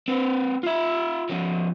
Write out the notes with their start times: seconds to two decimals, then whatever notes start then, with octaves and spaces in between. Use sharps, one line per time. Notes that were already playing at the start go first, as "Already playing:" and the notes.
0.08 C4 B4
0.63 F4 E5
1.29 F3 C#4